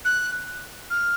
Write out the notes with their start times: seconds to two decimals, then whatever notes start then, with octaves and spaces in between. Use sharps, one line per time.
0.05 F#6
0.90 F6